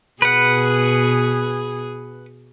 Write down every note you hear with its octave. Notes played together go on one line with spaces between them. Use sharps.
B2 G#4 B4 F#5